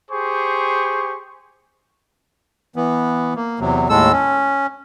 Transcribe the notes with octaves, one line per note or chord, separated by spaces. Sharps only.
G4 G#4 C5 C#6
E3 B3
A#3
E2 C3 F#3
D#2 A2 G#3 A4 E6
C#4